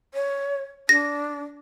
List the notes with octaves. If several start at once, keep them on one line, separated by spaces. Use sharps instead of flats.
C#5
D4 A#6